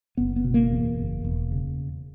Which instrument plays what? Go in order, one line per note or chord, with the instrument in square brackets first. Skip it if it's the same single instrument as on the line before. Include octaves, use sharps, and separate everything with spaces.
[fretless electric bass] F#1 B3
B3
B2
A#3
E2
F#1
E1
C#3